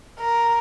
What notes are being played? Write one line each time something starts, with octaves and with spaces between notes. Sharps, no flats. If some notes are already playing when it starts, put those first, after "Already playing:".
A#4